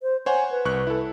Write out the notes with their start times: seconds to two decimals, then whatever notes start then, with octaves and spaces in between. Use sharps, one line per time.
0.02 C5
0.26 C5 C#5 F#5 G#5
0.51 B4
0.65 C2 C#6 F#6
0.87 E4 A4